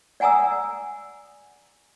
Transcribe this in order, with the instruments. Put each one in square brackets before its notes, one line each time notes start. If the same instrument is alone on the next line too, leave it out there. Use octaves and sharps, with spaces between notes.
[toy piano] D5 F#5 G#5 A#5 D#6 E6